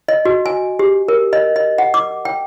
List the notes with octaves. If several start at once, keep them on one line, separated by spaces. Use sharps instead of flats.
D#5
F#4
G#5
G4
A#4
D#5
D#5
F#5
D6
G5